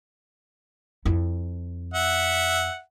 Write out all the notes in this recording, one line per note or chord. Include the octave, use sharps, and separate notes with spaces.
F2 E4
E5 F#5